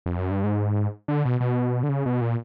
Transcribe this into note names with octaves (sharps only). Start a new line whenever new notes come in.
F2
F#2
G2
G#2
D3
B2
B2
D3
C#3
B2
A#2